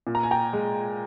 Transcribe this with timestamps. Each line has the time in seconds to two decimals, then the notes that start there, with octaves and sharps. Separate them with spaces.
0.07 A#2
0.15 A#5
0.23 G#5
0.31 G5 A#5
0.53 G#3